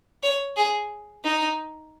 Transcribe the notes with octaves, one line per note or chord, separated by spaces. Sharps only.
C#5
G#4
D#4